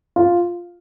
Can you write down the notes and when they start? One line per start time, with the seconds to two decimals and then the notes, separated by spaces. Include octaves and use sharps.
0.16 F4